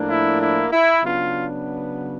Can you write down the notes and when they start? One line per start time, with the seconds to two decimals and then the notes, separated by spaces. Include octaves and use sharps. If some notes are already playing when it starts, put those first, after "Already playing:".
Already playing: A2 F3 A#3 D4
0.09 E4
0.41 E4
0.72 E4
1.04 C#3 F#3 B3 D4 F4